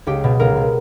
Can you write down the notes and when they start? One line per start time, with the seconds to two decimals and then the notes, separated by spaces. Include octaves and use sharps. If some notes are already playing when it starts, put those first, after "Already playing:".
0.07 C#2 G4
0.24 B2
0.40 C#2 A#4
0.57 B2